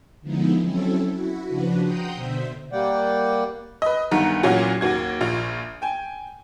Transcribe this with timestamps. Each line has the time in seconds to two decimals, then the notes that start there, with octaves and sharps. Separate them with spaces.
0.22 D3 F3 G#3 B3 D#4 E4
0.62 F#3 C4 C#4 E4 A4
1.10 E4 F#4
1.45 C#3 F3 D4 F#4 B4
1.83 F#5 G5 A#5 C6 D#6 G6
2.12 B2 D3 C5 E5
2.72 G3 A#3 D5 F#5 G5
3.82 B4 D#5
4.12 G1 G2 D#3 F#5 A#5
4.43 A#2 E3 F#3 C#4 F4 F#4
4.81 D#2 A#3 F#4 G#6
5.21 A#1 F4
5.82 G5 G#5